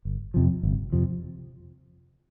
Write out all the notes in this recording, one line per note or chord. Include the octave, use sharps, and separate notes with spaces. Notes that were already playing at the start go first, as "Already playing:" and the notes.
G1
F2 C3 F3
G1
F2 C3 F3